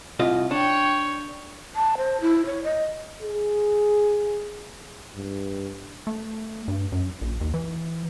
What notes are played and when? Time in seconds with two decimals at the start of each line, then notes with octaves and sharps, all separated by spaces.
0.19 C2 F4 D#5
0.51 D4 C#5 G5
1.75 A5
1.97 C5
2.21 E4
2.46 C#5
2.64 D#5
3.22 G#4
5.16 G2
6.07 A3
6.68 G2
6.92 F#2
7.22 A#1
7.41 D#2
7.54 E3